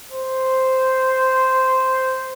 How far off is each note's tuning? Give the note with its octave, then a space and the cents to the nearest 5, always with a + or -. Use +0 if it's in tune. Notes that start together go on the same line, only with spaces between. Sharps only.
C5 -5